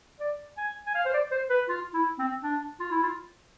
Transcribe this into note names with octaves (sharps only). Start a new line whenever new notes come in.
D5
G#5
G#5
F5
C5
D5
C5
B4
F4
E4
C4
D4
F4
E4
F4